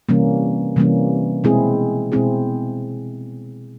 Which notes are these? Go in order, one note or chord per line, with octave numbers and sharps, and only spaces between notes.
C3 E3 G3 A#3 C#4
C3 E3 G3 A#3 C#4
B2 G#3 C4 E4 G#4
B2 G#3 C4 E4 G#4